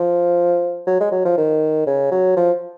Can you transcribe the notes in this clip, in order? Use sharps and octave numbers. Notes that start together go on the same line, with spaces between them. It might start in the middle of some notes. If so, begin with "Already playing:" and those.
Already playing: F3
F#3
G#3
F#3
F3
D#3
C#3
F#3
F3